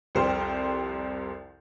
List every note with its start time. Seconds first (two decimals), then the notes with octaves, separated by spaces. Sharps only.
0.15 C2 F2 G4 C5 G5 F6